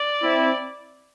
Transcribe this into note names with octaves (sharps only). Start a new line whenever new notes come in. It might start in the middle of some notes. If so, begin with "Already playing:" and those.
Already playing: D5
C4 E4